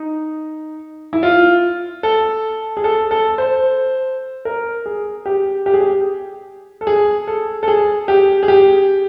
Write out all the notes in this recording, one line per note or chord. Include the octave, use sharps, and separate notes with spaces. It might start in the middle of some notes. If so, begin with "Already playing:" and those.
Already playing: D#4
E4
F4
A4
G#4
A4
A4
C5
A#4
G#4
G4
G4
G#4
G4
A4
G#4
A4
A4
G#4
G4
G#4
G4